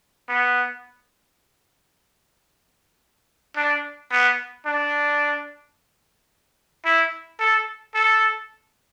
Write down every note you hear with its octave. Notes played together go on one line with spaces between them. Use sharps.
B3
D4
B3
D4
E4
A4
A4